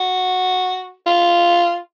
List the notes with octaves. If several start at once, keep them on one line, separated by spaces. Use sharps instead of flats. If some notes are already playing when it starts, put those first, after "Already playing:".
Already playing: F#4
F4